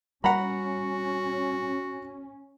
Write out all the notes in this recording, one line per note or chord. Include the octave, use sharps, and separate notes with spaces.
G3 C#4 F#4 F#5 A#5 B5